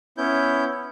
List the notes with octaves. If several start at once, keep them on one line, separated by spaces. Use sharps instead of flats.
B3 C#4 E4 G6